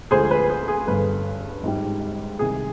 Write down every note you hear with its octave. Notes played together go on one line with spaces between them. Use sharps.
D2 D3 F3 G#3 G#4 C5
B4
G#4
G#4
G1 G2 D3 B4
G#1 G#2 G3
C2 C3 D#3 G#3 G#4